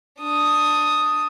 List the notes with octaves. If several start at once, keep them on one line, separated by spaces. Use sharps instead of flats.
D4 D#6